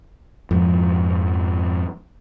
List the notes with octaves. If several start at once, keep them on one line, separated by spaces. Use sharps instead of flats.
F2 G#2 F3